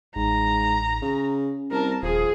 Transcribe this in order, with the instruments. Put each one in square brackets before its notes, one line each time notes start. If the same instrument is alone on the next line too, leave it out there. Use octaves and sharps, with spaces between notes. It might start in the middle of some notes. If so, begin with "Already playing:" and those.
[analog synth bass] A1 [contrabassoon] G#2 [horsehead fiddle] A#5
[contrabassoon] C#3 [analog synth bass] C#4
[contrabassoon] C2 [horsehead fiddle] A#4 A5
[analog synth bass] D#1 [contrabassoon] F3 [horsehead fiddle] G#4